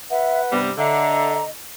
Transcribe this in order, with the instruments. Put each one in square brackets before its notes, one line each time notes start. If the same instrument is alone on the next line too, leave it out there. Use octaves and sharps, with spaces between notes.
[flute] B4 [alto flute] E5 [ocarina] F#5
[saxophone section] G2 C3 G3 [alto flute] B3
[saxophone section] D3 [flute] D#5 [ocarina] E5 [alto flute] A#5